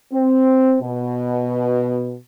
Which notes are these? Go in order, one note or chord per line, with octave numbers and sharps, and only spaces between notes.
C4
B2